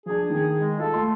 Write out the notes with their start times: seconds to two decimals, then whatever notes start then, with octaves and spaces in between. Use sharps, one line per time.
0.06 F3 D4 G#4
0.30 D#3 G#4
0.59 G#3
0.79 F4 A4
0.94 A3 C6